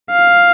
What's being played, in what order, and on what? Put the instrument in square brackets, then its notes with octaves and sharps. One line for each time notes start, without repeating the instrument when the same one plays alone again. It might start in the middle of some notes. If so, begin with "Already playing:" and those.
[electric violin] F5